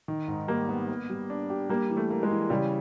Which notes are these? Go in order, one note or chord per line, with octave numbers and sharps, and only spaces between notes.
D#3
G#2
G3 A#3
B3
B3
G3
D4
G4
G3 A#3
E3
A3
A#3
G#3
E3
C#3 G3